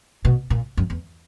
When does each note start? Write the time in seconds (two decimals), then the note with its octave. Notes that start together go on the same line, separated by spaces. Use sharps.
0.25 B2
0.50 A#2
0.77 F#2
0.90 E2